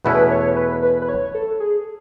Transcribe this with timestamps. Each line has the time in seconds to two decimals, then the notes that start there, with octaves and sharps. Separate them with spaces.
0.05 E2 B2 A3 C#4 E4 B4
0.31 C#5
0.56 B4
0.82 B4
1.02 B4
1.09 C#5
1.34 A4
1.60 G#4